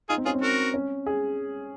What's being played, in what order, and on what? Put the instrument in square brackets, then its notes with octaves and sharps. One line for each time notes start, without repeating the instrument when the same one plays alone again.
[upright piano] D#4 [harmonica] F4 G#4
[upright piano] C4
[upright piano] C#4 [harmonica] F4 G#4
[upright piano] C4
[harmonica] F#4 A#4
[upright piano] C#4
G#4